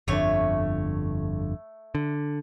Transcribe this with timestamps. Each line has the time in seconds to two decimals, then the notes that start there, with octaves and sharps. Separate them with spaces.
0.08 G1 F2 D3 A3 C#5
1.95 D3